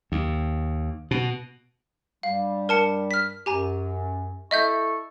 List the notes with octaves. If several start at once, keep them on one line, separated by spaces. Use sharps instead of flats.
D#2
B2
G2 G3 F5
A#4 A5 C#7
F6 B6
F#2 G4 G#5 A#5
E4 A4 D#5 E5 C#6 G6